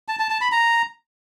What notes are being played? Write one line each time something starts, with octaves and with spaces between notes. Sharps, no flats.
A5
A5
A5
B5
A#5